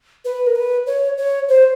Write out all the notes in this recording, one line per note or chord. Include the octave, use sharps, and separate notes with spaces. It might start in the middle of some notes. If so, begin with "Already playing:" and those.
B4
A#4
B4
C#5
C#5
C5